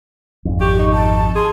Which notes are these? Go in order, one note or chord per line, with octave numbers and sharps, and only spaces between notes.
G#1 F2
G4 C#6
D#4
A5
G#4 C6